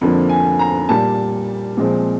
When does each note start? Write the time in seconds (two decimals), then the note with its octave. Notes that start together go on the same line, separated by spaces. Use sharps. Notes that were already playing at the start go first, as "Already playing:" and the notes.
0.01 F2 D3 F3 A#3
0.29 G#5
0.59 A#5
0.89 A#2 G3 A#3 A5
1.77 A#2 F3 G#3 C4